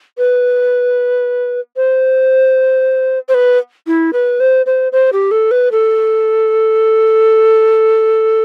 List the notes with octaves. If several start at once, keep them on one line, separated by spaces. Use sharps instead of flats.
B4
C5
C5
B4
E4
B4
C5
C5
C5
G4
A4
B4
A4